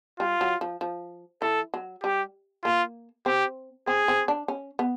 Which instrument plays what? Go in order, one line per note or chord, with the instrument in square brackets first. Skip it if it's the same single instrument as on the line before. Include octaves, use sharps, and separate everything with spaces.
[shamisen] G3 [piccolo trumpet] F4
[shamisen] F#3
F3
F3
[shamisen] E3 [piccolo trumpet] A4
[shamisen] F#3
[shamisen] G3 [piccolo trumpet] G4
[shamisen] A#3 [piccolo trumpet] F4
[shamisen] C4 [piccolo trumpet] G4
[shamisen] C4 [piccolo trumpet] G#4
[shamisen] C4
D4
C#4
B3